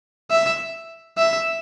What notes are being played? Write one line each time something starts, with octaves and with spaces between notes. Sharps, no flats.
E5
E5